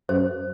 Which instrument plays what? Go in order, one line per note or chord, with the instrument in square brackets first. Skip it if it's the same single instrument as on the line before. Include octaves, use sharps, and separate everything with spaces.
[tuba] F#2 [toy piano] C5